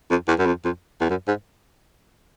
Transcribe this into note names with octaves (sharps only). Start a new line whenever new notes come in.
F2
E2
F#2
F2
F2
E2
F#2
G#2